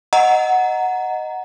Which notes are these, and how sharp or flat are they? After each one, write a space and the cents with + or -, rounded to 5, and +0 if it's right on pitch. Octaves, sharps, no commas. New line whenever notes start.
D#5 +0 F#5 +0 A#5 +0